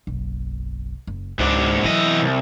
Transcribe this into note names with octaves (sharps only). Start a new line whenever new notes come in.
F#1 B1
F#1
C#2 G#2 D4
E3 F#3 E4 D#5
C2